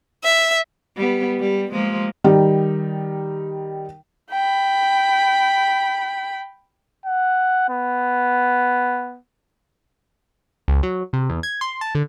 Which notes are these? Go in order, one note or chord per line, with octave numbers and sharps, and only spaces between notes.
E5
G3 B3
G3
F3 G#3 A#3
D#3 G3 D#4
G5 B5
F#5
B3
C#2
F#3
C3
E2
G#6
C6
A5
D3